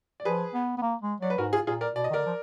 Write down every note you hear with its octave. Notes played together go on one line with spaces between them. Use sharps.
D5
F3 G#4 B4
B3
B3
A#3
G#3
F#3 D5
B4
G#2 F#4 A#4
F4 G#4
A#2 F4 G#4
A#4 D5
B2 D5
D#5
D#3
D3 A#4 D5
F3